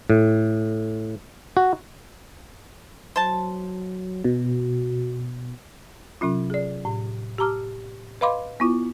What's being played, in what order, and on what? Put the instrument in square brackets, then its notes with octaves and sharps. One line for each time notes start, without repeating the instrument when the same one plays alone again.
[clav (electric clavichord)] A2
F#4
[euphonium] F#3 [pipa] C5 A5
[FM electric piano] B2 [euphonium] F#4
[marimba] C3 F#3 C#4 F4
G#4 D5
A2
G4 A5 A#5 D6 F6
B4 D#5 F5 B5 C6 D6
B3 E4 F4